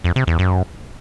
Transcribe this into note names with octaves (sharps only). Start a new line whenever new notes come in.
F2
C3
E2
F#2